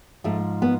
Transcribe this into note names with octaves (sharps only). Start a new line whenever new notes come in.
G#2 F3 A3
B3